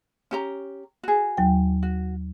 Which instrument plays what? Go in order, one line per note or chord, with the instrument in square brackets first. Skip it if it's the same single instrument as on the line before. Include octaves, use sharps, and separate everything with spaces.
[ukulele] C#4 G4 A#5
F#4 G#4
[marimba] D#2 F#3 G5
[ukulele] F#4